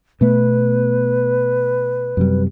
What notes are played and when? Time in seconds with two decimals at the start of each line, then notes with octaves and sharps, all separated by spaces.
0.21 B2 A3 B3 B4
2.17 F#2 C3 G3